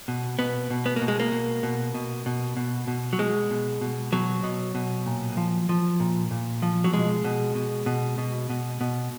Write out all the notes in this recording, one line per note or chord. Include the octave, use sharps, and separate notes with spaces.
B2
B2 B3
B2
B3
B2 A#3
G#3
A#3
B2
B2
B2
B2
B2
B2
F#3
B2 G#3
B2
B2
B2 F#3
B2
B2
A#2
F3
F3
A#2
A#2
F3
F#3
B2 G#3
B2
B2
B2
B2
B2
B2